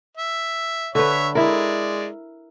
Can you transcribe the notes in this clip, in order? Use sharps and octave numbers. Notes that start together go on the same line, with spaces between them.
E5
D3 B4 C#5 E5
G#3 E4 A#4 D5